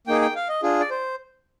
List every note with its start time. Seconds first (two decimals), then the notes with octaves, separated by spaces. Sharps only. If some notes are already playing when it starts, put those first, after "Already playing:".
0.07 A#3 D#4 G#4 G5
0.21 G5
0.36 F5
0.49 D#5
0.63 D4 F4 G#4
0.80 D5
0.90 C5